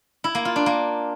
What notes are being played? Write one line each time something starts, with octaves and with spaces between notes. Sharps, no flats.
E4
A#3
F4
D4
A#3